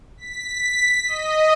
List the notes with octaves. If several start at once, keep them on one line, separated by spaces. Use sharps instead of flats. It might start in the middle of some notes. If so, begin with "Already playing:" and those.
B6
D#5